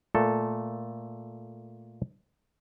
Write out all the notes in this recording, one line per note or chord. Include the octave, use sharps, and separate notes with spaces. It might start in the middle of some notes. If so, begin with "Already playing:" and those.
A#2 A3 A4